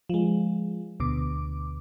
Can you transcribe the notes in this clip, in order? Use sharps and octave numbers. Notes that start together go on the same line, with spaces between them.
F3 G#3
D2 B2 D6